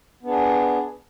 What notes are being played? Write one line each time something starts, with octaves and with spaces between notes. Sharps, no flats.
B3 D4 G#4